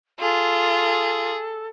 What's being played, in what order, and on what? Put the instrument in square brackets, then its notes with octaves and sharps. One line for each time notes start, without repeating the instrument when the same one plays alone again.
[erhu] F4 [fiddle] G#4 [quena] A4